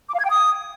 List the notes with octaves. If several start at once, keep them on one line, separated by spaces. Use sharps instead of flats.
D6
F5
G#6
G5
D#6